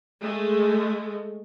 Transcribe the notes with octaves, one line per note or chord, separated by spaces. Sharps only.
G#3 A3